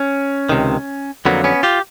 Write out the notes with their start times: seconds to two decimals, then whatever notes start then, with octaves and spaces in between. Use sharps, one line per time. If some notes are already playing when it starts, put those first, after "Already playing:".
Already playing: C#4
0.49 C#2 C3 D#3
1.25 F2 D3 F#3 A#3 B3
1.44 B3 C#4
1.63 F4 G4